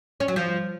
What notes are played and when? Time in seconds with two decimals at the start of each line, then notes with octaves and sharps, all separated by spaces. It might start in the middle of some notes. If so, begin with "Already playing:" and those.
0.20 C#4
0.28 F#3
0.36 F3